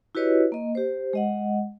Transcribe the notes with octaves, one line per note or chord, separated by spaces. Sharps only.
E4 F#4 G4 B4 C#5 D#5
A#3 D#5
G4 C5
G#3 D#5 F#5